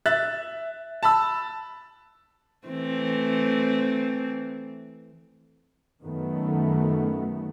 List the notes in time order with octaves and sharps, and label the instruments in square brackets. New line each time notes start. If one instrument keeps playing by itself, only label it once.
[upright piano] E5 F#6 A6
A5 B5 E6
[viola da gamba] E3 A3 C4
[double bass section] F#2 D#3 A3 B3